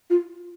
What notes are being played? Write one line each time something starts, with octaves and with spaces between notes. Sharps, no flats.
F4